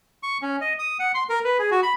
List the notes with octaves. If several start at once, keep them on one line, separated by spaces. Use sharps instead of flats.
C#6
C#4
D#5
D#6
F#5
C6
A#4
B4
G#4
F#4
B5